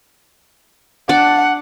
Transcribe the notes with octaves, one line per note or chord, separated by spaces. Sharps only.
D4 D5 F#5